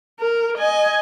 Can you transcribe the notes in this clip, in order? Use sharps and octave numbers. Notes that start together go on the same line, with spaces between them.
A#4
D#5 G#5